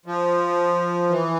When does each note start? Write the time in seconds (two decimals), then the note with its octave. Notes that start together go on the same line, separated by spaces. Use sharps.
0.06 F3
1.09 E3